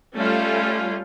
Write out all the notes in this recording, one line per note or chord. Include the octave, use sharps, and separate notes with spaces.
G3 A3 C#4 F4